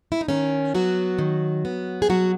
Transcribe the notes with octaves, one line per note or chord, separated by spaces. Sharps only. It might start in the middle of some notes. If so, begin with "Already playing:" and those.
E4
D#4
D#3 C#4
F#3 B3 F#4
D#3
B3
G#4
B2 F#3 F#4